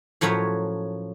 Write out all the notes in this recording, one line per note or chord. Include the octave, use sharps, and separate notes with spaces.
A2 F3 F#3 C#4 A#4 E5